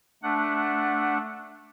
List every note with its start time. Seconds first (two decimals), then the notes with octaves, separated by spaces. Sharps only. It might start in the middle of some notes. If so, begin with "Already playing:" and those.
0.23 A3 D4 F#5